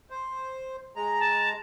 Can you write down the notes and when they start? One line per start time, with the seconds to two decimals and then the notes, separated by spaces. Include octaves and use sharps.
0.10 C5
0.96 G#3 A#5
1.20 A5